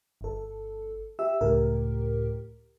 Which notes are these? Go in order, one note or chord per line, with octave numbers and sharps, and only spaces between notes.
G1 A4
G4 E5 E6
C#2 A2 G4 A#4